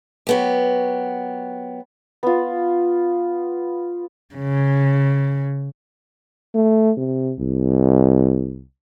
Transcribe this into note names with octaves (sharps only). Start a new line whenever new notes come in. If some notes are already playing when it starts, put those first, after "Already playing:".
F#3 B3 G4
B3 F4
C#3
A3
C3
C2